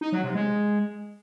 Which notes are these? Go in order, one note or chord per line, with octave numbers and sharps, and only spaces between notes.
D#4
F#3
C3
G#3